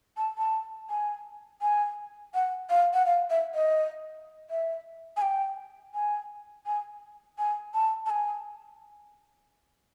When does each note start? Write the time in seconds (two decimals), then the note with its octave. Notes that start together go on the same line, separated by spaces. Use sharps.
0.17 A5
0.38 A5
0.90 G#5
1.62 G#5
2.34 F#5
2.70 F5
2.94 F#5
3.06 F5
3.30 E5
3.55 D#5
4.50 E5
5.17 G#5
5.22 G5
5.94 G#5
6.66 G#5
7.38 G#5
7.74 A5
8.06 A5
8.10 G#5